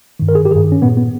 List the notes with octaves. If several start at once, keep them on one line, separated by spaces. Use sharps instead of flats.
G2 D#3
A#4
G#4
G4
G2 D#3 G#4
C#4
A#2 B3
B3